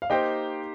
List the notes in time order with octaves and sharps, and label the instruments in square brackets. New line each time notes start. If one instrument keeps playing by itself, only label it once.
[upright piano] F5
[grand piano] A#3 D#4 G4 C5 [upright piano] D#5 G5